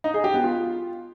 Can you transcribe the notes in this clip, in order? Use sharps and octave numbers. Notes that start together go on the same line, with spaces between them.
D#4
G#4
G4
B3
F4